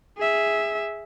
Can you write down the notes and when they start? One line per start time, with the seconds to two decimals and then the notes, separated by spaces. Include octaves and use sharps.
0.18 G#4 E5